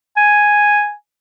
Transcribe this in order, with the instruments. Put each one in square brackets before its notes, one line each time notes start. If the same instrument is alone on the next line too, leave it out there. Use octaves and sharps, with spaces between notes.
[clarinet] G#5